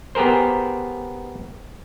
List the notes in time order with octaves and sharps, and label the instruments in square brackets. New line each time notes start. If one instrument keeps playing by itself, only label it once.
[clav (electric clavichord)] B3 G4 G#4 A#4 C5